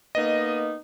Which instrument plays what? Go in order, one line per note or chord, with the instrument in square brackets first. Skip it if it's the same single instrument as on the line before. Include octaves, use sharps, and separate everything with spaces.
[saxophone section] A#3 B3 D#4 [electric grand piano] D#5